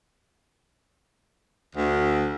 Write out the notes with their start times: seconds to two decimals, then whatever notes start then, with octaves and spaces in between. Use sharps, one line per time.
1.75 D2